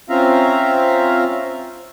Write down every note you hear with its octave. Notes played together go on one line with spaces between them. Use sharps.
C4 C#4 F4 E5 F5 A#5